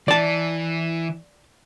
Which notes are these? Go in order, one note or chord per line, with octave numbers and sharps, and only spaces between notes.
E3 D5 A5